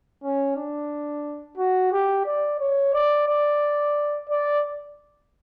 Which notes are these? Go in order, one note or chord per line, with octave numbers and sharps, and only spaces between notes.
C#4
D4
F#4
G4
D5
C#5
D5
D5
D5